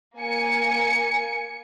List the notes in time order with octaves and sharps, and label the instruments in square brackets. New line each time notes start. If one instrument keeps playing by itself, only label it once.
[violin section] A#3 G#5 C#7